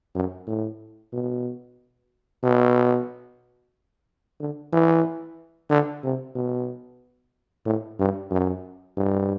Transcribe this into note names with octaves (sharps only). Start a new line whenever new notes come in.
F#2
A2
B2
B2
D3
E3
D3
C3
B2
A2
G2
F#2
G2